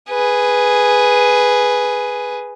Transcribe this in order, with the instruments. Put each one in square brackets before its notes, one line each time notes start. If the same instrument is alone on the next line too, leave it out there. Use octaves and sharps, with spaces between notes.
[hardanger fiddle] G#4 B4